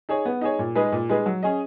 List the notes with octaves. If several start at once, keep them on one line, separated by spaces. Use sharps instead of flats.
D#4 G#4 C#5
B3
D#4 G#4 C#5
A#2
G#3 D#4 G#4 B4
A#2
G#3 D#4 G#4 B4
F#3
C#4 G#4 D#5